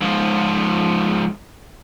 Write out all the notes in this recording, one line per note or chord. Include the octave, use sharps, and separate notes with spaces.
G#2 F3